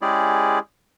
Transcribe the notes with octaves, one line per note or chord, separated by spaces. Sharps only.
G#3 C#4 E4 G4 G#4 D5